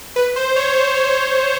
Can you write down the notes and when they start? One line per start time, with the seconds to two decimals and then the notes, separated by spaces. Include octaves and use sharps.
0.16 B4
0.36 C5
0.56 C#5
0.75 C#5
0.95 C5